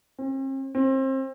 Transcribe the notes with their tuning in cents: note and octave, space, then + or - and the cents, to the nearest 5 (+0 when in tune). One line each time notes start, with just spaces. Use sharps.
C4 +45
C4 +30